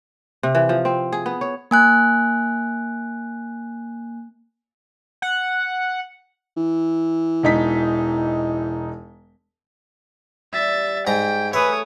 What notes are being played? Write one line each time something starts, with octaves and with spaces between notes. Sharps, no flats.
C3
E3
F3
C4
G#4
B3
C#5
A#3 G#5 F#6
F#5
E3
E1 D#4 B6
G3 E5 A6
G#2 G5 A#5
A3 G#4 A4 B4 C#5 E5 D#6